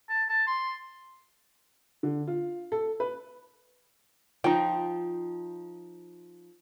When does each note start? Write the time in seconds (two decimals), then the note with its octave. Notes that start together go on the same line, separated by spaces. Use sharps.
0.09 A5
0.29 A5
0.47 C6
2.03 D3
2.27 F4
2.72 A4
3.00 B4
4.44 F3 D#4 G5